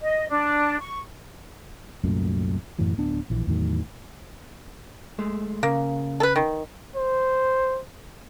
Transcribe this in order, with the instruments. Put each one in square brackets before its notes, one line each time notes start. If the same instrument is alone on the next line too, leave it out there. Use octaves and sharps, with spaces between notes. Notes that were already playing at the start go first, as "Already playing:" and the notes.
[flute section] D#5
D4
C#6
[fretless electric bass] C2 F#2 A#2 A3
F#2 A2 E3 F#3
D1 B3 D4
A#1 E3
E2 A2 D#3 F#3
[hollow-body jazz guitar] G#3 A3
[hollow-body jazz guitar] C#3 [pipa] A#3
[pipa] A4 B4
D#3
[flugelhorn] C5